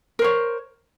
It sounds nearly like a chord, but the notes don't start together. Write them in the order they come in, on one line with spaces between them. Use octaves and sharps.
A#4 C5 C#5